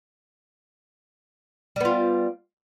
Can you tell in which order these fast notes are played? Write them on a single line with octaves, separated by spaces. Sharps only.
G3 B3 F4